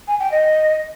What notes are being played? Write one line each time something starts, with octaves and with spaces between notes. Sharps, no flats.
G#5
G5
D#5